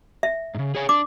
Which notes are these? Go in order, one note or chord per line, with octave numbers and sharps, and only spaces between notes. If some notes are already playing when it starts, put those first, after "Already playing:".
E5
G#2 C#3
G#4 C#5 G#5
D4 D6